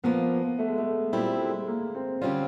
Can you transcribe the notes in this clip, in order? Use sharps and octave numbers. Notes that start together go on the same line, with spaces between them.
A#2 F3 A#3 B3
A3
G#3
A3
A#2 G3 G#3 C4 E4
A3
G#3
A3
A#3
C4
D3 G3 C4 C#4 F4